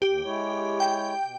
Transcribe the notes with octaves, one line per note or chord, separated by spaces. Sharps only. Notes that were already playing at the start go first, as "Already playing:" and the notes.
D#2 G4
G#3 E4 C#5
G5
B2